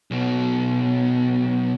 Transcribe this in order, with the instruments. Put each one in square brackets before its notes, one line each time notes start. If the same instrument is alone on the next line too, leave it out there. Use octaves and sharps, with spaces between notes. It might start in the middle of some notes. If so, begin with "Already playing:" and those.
[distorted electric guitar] B1 B2